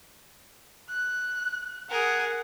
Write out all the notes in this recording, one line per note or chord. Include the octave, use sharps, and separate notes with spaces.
F#6
G#4 A#4 F#5